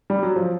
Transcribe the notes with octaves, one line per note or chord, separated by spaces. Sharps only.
G3
F#3
F3